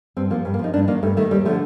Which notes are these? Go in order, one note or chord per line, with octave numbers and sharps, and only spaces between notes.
G2 C4
F3 A#3
G2
A#3
F3 D#4
G2 D4
D#3 A#3
G2 A3
D#3 A3
D#2 G3
D3 F3 A3